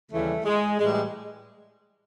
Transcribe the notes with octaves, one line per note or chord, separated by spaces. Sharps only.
D#2 C#3 E3 G3 A3
G#3
A2 E3 G3 G#3
G#3